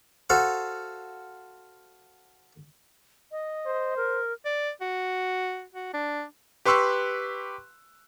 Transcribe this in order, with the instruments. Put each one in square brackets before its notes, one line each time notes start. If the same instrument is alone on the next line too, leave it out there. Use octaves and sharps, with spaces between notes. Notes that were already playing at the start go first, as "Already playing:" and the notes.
[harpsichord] F#4 A4 C5 F5 F#5
[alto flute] D#5
[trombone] C5
[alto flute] A#4
[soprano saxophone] D5
F#4
F#4
D4
[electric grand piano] G4 B4 C6 C#6 E6 F#6